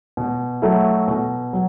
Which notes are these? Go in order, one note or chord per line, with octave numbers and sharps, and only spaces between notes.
B2
F#3 A3 E4
B2
F#3